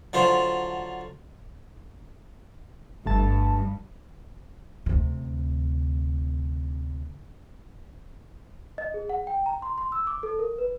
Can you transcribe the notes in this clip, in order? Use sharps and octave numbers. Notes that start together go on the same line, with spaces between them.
D3 F#3 F4 C5
G1 G2 A3 A5
D2 C3
D#5
G#4
F#5
G5
A#5
C6
C6
E6
D6
A4
A#4
B4